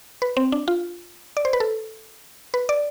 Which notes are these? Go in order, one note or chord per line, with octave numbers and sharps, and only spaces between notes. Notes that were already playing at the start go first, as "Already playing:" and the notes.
B4
C4
D4
F4
D5
C5
B4
A4
B4
D5